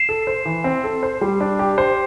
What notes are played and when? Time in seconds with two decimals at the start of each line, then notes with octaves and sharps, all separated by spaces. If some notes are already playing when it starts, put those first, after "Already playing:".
Already playing: C7 E7
0.09 A4
0.27 C5
0.45 E3
0.64 C4
0.84 A4
1.03 C5
1.21 G3
1.40 D4
1.59 G4
1.78 C5